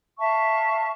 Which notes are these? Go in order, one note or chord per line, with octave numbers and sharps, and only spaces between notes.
E5 F5 A5 C#6